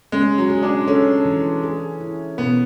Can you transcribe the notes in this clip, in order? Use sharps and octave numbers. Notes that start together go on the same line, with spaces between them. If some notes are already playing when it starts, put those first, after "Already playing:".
G#3 C#4
F#3
G#4
D4
C#4 A4
E3
G#4
E4
B2 B3